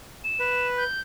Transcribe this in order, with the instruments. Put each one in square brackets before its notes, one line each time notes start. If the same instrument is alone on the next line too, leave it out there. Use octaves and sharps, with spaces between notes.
[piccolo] E7
[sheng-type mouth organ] B4
[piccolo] G6